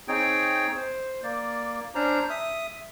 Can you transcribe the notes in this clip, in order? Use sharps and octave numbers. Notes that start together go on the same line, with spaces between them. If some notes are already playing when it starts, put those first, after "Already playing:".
C4 D#4 G#4 C#5 G5
C5
A#3 D5
C#4 D4 C5 A#5
E5 D#6